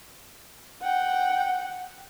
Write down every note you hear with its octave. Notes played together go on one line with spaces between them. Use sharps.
F#5 G5